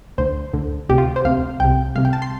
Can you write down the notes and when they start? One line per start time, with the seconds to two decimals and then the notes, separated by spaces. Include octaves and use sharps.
0.18 D2 D3 C5
0.54 D2 D3
0.89 D2 C3 G4
0.98 F4
1.16 C5
1.25 D2 C3 F5
1.60 C2 C3 G5
1.95 C2 C3 F5
2.05 G5
2.13 A5
2.22 C6